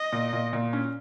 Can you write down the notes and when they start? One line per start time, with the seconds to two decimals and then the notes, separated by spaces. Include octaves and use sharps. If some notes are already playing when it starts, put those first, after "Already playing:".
Already playing: D#5
0.13 A#2
0.33 A#2
0.53 A#2
0.73 C#4